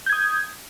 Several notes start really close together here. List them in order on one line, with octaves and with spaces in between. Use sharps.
G6 G#6 D#6